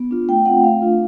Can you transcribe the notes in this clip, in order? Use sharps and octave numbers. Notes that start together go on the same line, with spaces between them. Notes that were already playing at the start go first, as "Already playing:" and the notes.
Already playing: B3
D4 F4
A3 G5
C4 F4 F#5
A3 F5
D4 F4